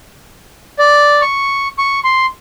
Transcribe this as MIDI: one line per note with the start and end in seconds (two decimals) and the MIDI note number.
0.79 1.21 74
1.22 1.68 85
1.78 2.00 85
2.04 2.26 84